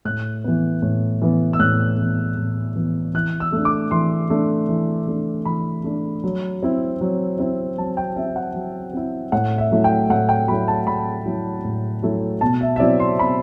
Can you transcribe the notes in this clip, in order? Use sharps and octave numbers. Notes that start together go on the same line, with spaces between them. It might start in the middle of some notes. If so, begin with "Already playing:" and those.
A2 F#6
E3 B3
A2
E3 B3
E6
A2 F#6
E3 B3
A2
E3 B3
E3 F#6
E6
A3 D4
D6
E3 C6
A3 D4
E3
A3 D4
E3 B5
A3 D4
F#3
C4 E4
F#3
C4 E4
F#3 A5
G5
C4 E4 E5
F#5
F#3
C4 E4
A2 F#5
E5
F#3 A3 E4
G5
A2 F#5
G5
F#3 A3 E4 B5
A5
A2 B5
F#3 A3 E4
A2
F#3 A3 E4
B2 A5
E5
E5
F#3 C4 E4 D5
C6
B2 B5